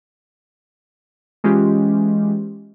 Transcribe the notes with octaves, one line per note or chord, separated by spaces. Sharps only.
E3 G#3 C#4 F4 G4